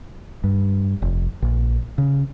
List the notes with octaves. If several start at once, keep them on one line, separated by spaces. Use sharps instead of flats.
G2
F1
A#1
C#3